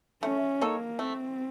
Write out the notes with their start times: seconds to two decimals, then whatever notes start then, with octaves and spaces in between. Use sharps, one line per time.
0.23 A3 C#4
0.61 A#3 D#4 A4 C#5
0.99 A3 C4